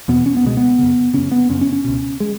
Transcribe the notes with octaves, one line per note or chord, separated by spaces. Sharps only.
E2 B2 B3
C#4
B3
C#2 B2 G#3
B3
F#2 C#3
F#2 C#3 C#4
B3
F#2 C#3 C#4
C#4
C#4
C#2 B2
G#3